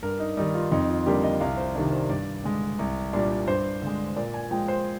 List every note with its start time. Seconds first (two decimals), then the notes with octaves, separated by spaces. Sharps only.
0.03 G2 A#4
0.20 D#4
0.37 D#3 G3 D#4
0.54 F4
0.71 F2 D#4
0.89 F4
1.06 D3 G3 A#3 D4 G4
1.23 D#5
1.40 C2 F5
1.57 C5
1.75 C3 D#3 G3 D4
1.92 C5
2.10 G2 D5
2.44 D3 G#3
2.79 C2
3.13 A#2 G3 A#3 D4
3.48 G2 C5
3.82 D3 G#3
4.16 A#2 D5
4.34 G#5
4.51 F3 G#3 G5
4.68 C5